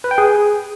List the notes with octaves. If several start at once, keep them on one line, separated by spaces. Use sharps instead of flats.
B4
G5
G#4